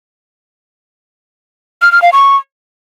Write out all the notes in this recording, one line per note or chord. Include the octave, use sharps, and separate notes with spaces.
F6
F6
F5
C#6